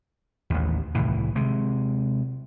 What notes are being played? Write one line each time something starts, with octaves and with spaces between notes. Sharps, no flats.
A1 D#2
C2 A2 D#3 E3
C3 G#3